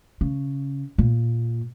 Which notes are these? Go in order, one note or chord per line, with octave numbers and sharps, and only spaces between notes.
C#3
A#2